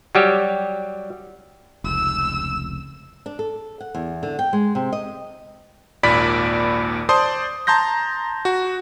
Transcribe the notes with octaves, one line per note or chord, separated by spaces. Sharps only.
F#3 G3 G4
F1 C#2 E6
D4
A4
F#5
E2
D3
G5
G#3
C3
D#5
G#1 D#2 A#2 D5 B5 B6
C5 D5 A5 C6 D#6
A5 A#5 C6 G6 A#6
F#4